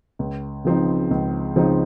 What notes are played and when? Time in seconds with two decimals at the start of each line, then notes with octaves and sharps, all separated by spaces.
0.19 C#2
0.65 C#3 F3 C4 D#4
1.11 C#2
1.56 C#3 F3 C4 D#4